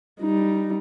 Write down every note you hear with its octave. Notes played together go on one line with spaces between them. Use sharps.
G3 D#4